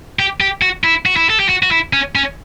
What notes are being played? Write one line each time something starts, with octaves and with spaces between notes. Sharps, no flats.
G4
G4
F#4
E4
F#4
E4
A4
G4
F#4
F#4
E4
C#4
C#4